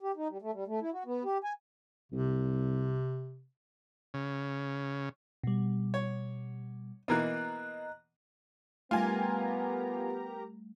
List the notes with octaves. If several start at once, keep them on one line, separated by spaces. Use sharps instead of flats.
G4
D#4
G3
A3
G3
A3
E4
F#4
B3
G4
G#5
C2 C3
C#3
B2 G3
C#5
B2 E3 A#3 D#5 A#5 F#6
G3 A3 B3 F4 G4 A#4 G#5 A#5